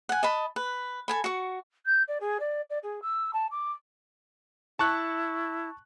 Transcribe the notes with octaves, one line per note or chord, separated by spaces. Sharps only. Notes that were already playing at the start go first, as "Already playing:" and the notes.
F#5 G#5
D#5 A5 B5
B4
A4 G#5 B5
F#4 C#6
G6
D5
G#4
D5
D5
G#4
E6
A5
D6
E4 A5 C#6 F#6